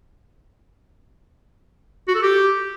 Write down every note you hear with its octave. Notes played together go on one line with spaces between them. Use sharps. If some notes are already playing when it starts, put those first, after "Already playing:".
F#4
A4
G4